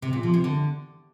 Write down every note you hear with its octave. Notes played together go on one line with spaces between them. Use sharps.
C3
A#2
F3
C3
D3